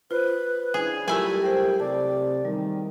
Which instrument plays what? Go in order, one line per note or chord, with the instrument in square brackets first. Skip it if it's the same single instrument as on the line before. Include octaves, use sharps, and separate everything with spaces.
[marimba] F4 C5 [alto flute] B4
[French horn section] C#4 D4 E4 [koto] G#4
[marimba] F#3 F4 [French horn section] G3 G4 [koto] A3 E4 G#5 [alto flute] A#4
[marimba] A#4 C5 [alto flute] G5
[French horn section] C3 [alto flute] D5 [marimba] A5
[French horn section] E2 D#3 [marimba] G3